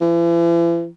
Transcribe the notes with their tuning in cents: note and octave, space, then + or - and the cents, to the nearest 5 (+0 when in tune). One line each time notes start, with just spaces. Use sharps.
E3 +40